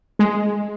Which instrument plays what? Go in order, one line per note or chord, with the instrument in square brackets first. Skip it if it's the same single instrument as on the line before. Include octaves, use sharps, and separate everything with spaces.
[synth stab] G#3